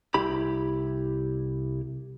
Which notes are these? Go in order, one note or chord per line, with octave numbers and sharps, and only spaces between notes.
C2 E4 G4 B5